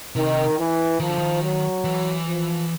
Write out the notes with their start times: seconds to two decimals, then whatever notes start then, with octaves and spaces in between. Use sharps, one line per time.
0.15 C3 D#3
0.58 E3
1.00 D#3 F3
1.09 D3
1.18 D#3
1.42 F#3
1.84 E3
2.27 F3